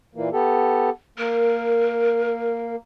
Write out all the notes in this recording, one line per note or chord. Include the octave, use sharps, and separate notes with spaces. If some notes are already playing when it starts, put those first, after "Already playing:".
A#2 E3 A#3
B3 G4 A4
A#3 A#4